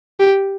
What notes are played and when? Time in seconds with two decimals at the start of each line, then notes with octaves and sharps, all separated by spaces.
0.20 G4